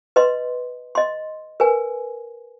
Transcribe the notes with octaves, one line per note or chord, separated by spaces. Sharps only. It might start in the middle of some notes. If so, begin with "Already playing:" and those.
B4 D#5 C6
D#5 C6
A#4 B4 G#5